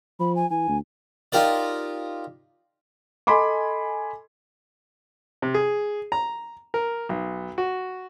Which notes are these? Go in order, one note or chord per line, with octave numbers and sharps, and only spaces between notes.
F3 B5
G#5
E3 G#5
D2
D#4 F4 G4 A#4 D5
A4 D#5 G#5 B5 C6 D6
C3
G#4
A#5
A#4
B1
F#4